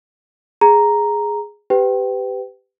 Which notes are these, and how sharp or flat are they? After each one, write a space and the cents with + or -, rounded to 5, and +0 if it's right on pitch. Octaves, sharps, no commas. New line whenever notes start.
G#4 +0 A#5 +0
G4 +0 B4 +30 G5 -15